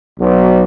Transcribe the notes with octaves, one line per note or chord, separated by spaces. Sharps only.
B1